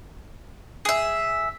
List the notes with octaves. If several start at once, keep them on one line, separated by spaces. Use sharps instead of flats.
G#4 E5